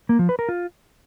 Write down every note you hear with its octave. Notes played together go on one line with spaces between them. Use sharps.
A#3
F3
B4
A#4
F4